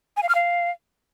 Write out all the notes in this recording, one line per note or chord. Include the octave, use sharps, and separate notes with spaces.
G#5
F5
F6
F5